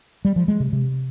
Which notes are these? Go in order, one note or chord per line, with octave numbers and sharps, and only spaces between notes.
G3
F3
G#3
C3
C3